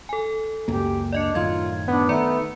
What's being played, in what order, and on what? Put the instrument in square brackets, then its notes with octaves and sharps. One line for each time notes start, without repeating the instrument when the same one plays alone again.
[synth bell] A4 G#5
[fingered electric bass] C#2 F#2 A#3 [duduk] G4
[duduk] D4 [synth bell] D5 D#5 C#7
[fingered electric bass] F#2 A2 D#3 [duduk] F4 [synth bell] G#6
[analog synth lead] B3 [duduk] D4
[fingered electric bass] D#3 [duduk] A3 [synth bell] D5 A#5 C#7